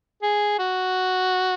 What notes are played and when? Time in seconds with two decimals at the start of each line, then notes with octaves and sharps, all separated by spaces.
0.22 G#4
0.59 F#4